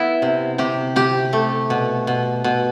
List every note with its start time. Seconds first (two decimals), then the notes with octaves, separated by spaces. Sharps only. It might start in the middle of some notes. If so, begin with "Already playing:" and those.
Already playing: B3 E4
0.22 C3
0.58 C3 G4
0.96 C3 G4
1.33 A3
1.70 B2
2.07 B2
2.44 B2